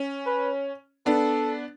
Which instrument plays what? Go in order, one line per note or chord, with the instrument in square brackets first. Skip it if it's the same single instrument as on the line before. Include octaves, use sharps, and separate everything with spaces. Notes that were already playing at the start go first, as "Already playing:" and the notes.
Already playing: [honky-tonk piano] C#4
[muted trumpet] B4
[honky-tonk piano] B3 D4 [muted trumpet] A4